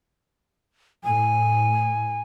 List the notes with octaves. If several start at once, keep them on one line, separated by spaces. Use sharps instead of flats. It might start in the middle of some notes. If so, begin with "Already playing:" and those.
A2 G#5